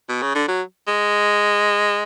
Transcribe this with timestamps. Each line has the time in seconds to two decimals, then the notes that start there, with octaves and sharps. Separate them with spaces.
0.09 B2
0.22 C#3
0.35 D3
0.48 F#3
0.88 G#3